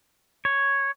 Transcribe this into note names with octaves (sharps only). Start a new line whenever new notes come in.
C#5